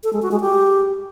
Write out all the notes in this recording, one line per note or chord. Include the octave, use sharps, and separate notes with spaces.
A4
G#3
F#4
G#3
G4